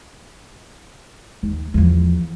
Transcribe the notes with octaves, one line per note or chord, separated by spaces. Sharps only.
D#2
E2 F3